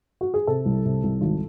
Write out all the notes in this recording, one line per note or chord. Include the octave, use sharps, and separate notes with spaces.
F#4
G#4
C3 A4
C2
C3
C2
G#1